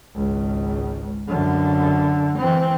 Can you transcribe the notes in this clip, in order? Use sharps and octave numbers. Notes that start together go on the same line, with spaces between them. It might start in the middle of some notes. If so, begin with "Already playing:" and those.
G#1 C#2
F#2 D3
E3 C4